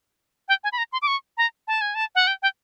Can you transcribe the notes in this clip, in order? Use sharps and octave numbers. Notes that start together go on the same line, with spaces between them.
G5
G#5
B5
A#5
C6
D6
C#6
A#5
A5
G#5
A5
F#5
G5
G5